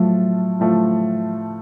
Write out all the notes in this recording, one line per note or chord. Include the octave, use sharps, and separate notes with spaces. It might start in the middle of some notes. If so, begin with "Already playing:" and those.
Already playing: A2 F3 F#3 A3 F4
A2 F3 A3 F4